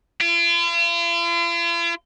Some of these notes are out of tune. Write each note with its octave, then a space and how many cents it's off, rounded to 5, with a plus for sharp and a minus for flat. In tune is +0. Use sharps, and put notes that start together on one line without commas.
F4 -45